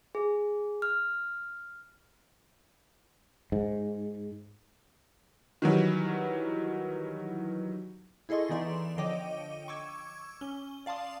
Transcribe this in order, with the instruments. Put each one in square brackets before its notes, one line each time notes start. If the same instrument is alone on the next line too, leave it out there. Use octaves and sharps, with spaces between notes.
[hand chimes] G#4
F6
[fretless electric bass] G#2
[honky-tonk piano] D#3 E3 F#3 G3
[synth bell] E4 G#4 A4 D#5 C6 C#6
E3 B3 D#4 D5 E5 C6
D3 F3 C#5 D#5 G5 D6
C#6 D6 E6 G#6
C#4 G7
D5 F5 A5 C6 D#6